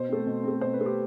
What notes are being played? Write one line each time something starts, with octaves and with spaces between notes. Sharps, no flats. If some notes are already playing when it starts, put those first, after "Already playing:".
Already playing: B2 C5
A3 C4
B2
A3 C4
B2 C5
B4
A3 C4
G4